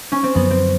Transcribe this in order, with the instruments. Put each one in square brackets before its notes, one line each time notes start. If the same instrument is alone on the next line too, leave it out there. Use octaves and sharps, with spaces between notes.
[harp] C#4
C4
[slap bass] F#2 D3 F3 [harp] B3
[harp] C4